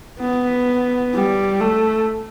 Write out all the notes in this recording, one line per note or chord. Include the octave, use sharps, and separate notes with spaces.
B3
G3
A3